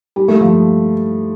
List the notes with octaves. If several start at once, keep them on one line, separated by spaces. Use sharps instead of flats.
G3
A3
F3